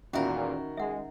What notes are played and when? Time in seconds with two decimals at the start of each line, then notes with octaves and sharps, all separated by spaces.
0.13 E2 A#2 D#3 C#4 F#4 A#4 E5 B5
0.77 G#3 E5 F#5